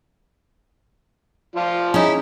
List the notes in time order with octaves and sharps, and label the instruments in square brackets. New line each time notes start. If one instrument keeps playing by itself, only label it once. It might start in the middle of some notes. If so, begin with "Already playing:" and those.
[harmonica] F3 F4 D5
[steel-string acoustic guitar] C#4 E4 [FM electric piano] D#4 G#4